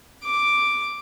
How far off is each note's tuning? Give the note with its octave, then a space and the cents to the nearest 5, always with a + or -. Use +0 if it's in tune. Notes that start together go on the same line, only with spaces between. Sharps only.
D6 +0